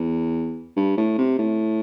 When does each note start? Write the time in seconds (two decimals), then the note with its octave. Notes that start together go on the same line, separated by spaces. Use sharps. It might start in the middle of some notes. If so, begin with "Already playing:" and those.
Already playing: E2
0.76 G2
0.97 A2
1.18 C3
1.39 A2